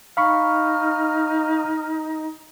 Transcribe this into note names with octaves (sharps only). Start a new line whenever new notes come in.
D#4 F5 B5 C#6 F6